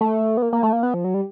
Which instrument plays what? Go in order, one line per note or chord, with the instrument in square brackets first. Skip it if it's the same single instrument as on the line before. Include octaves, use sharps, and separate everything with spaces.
[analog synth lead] A3
B3
A#3
A#3
A3
A#3
B3
F3
F#3
G3